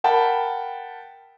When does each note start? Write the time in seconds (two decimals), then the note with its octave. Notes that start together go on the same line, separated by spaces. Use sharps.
0.04 A#4 F#5 G5 A5 B5